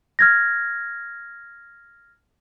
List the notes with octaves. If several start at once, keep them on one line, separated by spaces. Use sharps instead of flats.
F6 G#6 A#6